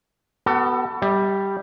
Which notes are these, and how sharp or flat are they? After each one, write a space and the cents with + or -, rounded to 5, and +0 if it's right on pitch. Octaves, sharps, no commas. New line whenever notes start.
B3 +0 F#4 +45 A4 +30
G3 +0 E5 -45